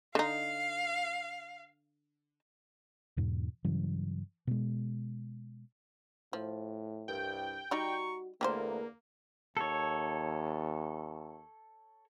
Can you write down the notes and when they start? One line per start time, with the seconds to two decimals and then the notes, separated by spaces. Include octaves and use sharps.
0.15 D3 D#4 F5
3.17 E2 G#2 B2
3.64 G2 C#3 E3 F#3
4.47 B2 G#3
6.33 A2 F3
7.08 C2 G2 G5
7.71 G3 D#4 F#4 D5 A#5 C#6
8.41 E2 D3 A3 A#3 G4 G#4 C5
9.57 D#2 A4 C#5